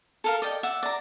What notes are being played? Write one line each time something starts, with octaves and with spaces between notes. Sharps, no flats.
A4 A#4 F5
D5 D#5 G5
E5 F#5 D6
D5 A#5